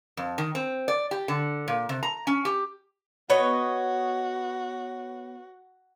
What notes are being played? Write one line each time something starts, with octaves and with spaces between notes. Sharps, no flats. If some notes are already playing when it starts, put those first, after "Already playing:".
F2
D#3
C4
D5
G4
D3
A#2
C3
A#5
C#4
G4
B3 F#4 C#5 D#5